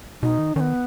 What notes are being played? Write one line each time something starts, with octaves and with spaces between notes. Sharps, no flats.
B2 D#4
D#3
D#3 B3 C#4